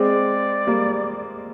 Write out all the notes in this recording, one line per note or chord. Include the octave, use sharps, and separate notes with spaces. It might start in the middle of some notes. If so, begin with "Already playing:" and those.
Already playing: G#3 C4 D5
G3 A#3